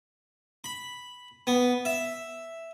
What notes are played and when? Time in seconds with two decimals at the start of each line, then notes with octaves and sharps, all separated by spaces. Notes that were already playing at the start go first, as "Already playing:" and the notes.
0.64 B5
1.47 B3
1.85 E5